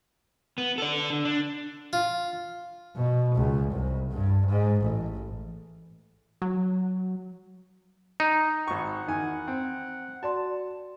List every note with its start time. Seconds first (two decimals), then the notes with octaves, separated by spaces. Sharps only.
0.58 B3
0.78 A4 D5
1.10 D3
1.25 D4
1.93 F4
2.96 B2
3.35 C#2
3.71 C2
4.11 G2
4.47 G#2
4.81 A1
6.42 F#3
8.20 D#4
8.67 G#1 F#5 C#6
9.08 E2 D#3 G#5
9.48 C4
10.23 F#4 D5 A5 C6